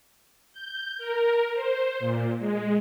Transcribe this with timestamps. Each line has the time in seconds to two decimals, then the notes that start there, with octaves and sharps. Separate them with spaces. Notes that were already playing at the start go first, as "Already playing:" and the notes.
0.53 G6
0.98 A#4
1.54 C5
1.99 A#2
2.39 G#3